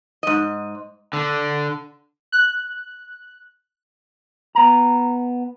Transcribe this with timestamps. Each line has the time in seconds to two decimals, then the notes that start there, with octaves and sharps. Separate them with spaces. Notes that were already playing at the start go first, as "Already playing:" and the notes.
0.23 G#2 D#5
1.13 D3
2.32 F#6
4.55 B3 A#5